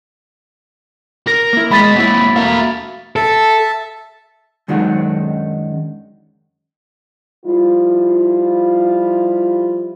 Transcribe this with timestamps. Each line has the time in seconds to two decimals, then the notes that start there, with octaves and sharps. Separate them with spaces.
1.27 A#4 A#6
1.53 A#3 E4
1.71 G#3 B3 D#5 B5 A6 B6
1.96 F#3 A#3 C4 E4
2.36 A3 A#3 F#4 E5 F5
3.16 A4 E5 A5
4.68 F#2 D#3 F#3 G#3 D4 F#4
7.45 F3 G3 E4 F4